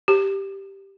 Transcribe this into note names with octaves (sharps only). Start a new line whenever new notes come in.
G4